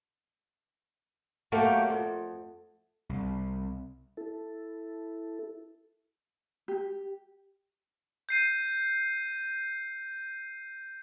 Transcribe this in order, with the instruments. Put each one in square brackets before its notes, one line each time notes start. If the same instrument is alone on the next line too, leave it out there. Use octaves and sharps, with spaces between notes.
[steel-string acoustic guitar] F#3 A3 A#3 G4
F2
[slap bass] C2
[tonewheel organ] E4 A4
[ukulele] G4
[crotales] G6 C7 D#7